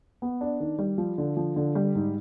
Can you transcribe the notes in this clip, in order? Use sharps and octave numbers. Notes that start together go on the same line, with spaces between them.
B3
D4
D#3
G3
F3
D3
F3
D3
G3
G#2